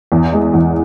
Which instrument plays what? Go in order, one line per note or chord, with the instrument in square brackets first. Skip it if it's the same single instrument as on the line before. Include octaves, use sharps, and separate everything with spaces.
[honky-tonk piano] E2
G#3
E2